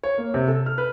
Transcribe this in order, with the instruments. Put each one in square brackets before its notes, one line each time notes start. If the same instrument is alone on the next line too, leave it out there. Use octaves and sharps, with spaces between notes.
[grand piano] C#5
A#3
C3
A4
F6
B4